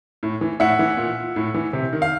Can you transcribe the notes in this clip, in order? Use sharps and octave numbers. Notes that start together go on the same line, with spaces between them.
A2
E3
A2 E5 F#5
E3
A#2
A2
E3
C3
D#3
F5